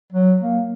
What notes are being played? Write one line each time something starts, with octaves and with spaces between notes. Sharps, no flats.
F#3
A#3